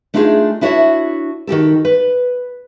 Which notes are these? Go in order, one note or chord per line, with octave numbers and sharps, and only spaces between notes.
A3 D4 D#4 F4 F#4 G#4
D4 E4 F#4 C#5 D5 E5
D#3 F#4 G4 A4
B4